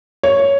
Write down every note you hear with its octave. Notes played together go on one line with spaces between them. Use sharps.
C#5